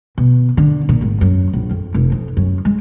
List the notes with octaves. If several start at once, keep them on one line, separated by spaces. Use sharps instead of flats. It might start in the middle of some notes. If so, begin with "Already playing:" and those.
B2
D3
A#2
G#1
F#2
A#1
F2
F1
F2
F#2
G#3